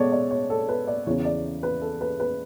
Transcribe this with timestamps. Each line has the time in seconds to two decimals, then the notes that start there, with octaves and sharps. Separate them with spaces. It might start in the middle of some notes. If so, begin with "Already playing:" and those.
Already playing: B2 G#3 B3 A4 C#5 D5
0.12 D5
0.31 C#5
0.50 A4
0.69 B4
0.87 D5
1.07 E2 C#3 E3 C#5
1.25 D5
1.63 B4
1.82 A4
2.01 B4
2.20 B4